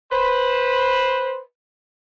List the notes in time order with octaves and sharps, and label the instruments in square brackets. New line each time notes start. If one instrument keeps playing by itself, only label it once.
[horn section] B4 C5